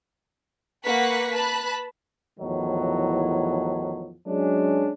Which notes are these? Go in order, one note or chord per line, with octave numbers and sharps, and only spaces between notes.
A#3 B4 F#5 C#6 F#6 B6
B4 A5 B5 F#6
E2 A2 D#3 F3 F#3
F#3 G#3 C#4 D4